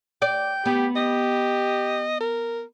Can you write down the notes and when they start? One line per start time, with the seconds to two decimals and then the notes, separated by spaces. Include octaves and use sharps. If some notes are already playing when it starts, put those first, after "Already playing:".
0.22 D5 G5
0.65 B3 G4
0.96 G4 D#5
2.21 A#4